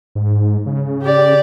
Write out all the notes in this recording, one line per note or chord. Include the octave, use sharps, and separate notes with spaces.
G#2
C#3
G4 D5